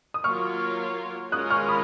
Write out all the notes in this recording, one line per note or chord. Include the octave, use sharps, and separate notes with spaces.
D#6
F#3 A#3 F4 A#4 C#5 C#6 F6
G#3 C#4 F4 A#4 D#6 F#6
C#6 F6
B5 D#6